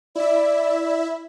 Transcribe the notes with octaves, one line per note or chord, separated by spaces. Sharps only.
E4 D5 E5